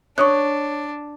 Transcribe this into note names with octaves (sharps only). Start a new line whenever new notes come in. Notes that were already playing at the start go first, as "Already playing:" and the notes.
D4 C#5 C#6 D#6 F#6